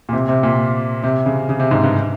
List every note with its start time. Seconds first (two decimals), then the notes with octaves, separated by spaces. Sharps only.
0.09 A#2
0.13 C3
0.29 C3
0.43 A#2
1.04 C3
1.26 C#3
1.49 C#3
1.60 C3
1.71 G#2
1.84 G2